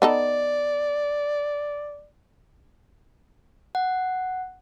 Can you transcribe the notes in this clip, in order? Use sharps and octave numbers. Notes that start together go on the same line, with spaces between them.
B3 D#4 A4 D5
F#5